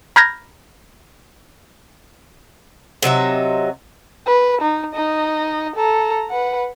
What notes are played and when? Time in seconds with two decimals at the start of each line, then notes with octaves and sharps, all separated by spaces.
0.16 A#5 B5 F6 G6 G#6 A#6
3.02 C3 F#3 D#4 E5
4.27 B4
4.62 D#4
4.94 D#4 D#5
5.76 A4 A#5
6.30 B4 F#5